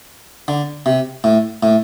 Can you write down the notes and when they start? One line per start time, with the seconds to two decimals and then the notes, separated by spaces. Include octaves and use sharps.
0.48 D3
0.86 C3
1.24 A2
1.63 A2